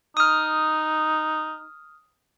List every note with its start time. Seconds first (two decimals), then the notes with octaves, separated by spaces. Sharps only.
0.17 D#4 D#6 F6